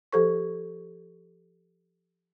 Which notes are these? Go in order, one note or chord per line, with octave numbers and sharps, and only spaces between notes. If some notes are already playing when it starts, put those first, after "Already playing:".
F3 G4 A4 C5 C#6